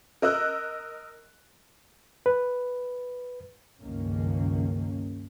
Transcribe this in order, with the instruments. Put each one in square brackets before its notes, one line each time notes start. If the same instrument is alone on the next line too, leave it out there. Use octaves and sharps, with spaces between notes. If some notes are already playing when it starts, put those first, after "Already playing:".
[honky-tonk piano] A#4 D#5 E6 F#6
[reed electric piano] B4
[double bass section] C#2 G2 D#3 A#3 C#4